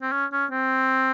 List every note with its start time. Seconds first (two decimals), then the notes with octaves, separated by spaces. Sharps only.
0.02 C4
0.12 C#4
0.32 C#4
0.51 C4